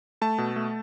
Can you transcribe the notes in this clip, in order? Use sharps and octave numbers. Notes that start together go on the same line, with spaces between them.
A3 A5
B2
A3